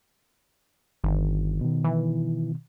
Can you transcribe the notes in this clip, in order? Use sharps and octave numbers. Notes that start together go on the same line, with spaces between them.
G1 D#3
B2 D#3
E3